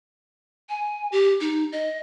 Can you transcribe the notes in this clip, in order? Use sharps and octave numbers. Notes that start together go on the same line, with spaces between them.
G#5
G4
D#4
D#5